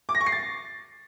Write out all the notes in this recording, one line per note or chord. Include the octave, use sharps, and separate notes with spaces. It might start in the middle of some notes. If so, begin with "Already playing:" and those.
D6
A#6
C#6
C7
A6